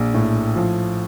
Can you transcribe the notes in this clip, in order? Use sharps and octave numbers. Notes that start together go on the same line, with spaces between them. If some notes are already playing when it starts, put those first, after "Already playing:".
Already playing: A#1
A2
F3